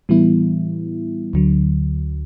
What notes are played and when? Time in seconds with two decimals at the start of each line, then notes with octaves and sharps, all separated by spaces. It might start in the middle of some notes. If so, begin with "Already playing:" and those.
0.09 A2 E3 G3 B3 E4
1.33 D2 D3 F#3